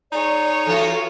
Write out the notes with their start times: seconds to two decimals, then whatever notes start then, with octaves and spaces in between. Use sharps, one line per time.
0.12 D#4 G#4 C#5 D5
0.66 E3 F4 F#4 A4